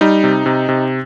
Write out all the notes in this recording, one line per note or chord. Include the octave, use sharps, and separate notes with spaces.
G3 D#4
C3
C3
C3